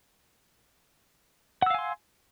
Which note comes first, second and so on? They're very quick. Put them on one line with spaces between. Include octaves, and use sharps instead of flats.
F#5 E6 F5 G#5 C6